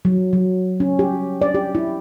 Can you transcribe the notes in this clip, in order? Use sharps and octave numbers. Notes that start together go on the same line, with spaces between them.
F#3
F#3
C#4
G4
D5
G4
E4